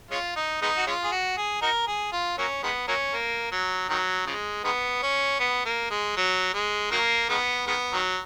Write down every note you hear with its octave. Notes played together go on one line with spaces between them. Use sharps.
G#3 C#4 F4
D#4
G#3 B3 D#4
F#4
G#3 C#4 F4
G#4
F#4
G#4
D#4 F#4 A#4
G#4
F4
F#3 A#3 C#4
D#3 G#3 B3
F#3 A#3 C#4
A#3
F#3
D#3 F#3
C#3 F3 G#3
D#3 G#3 B3
C#4
B3
A#3
G#3
F#3
G#3
D#3 F#3 A#3
D#3 G#3 B3
D#3 G#3 B3
D#3 F#3